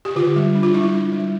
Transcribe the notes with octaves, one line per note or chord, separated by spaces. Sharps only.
G4
D3 F4
G3
D4
F4
G3 E4
D4
G3